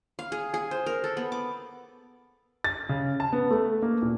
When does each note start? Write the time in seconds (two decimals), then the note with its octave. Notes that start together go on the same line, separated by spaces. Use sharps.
0.19 F5
0.32 G#4
0.54 G#4
0.71 C5
0.86 A#4
1.04 A4
1.17 B3
1.32 D6
2.64 A6
2.89 C#3
3.20 A5
3.33 B3
3.51 A3
3.82 A#3
4.02 A#2